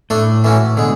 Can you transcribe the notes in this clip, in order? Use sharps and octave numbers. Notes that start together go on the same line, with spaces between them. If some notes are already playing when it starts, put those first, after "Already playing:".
A2 A3 D4 A4
E3 A3 C#4 F#4
B2 D3 G#3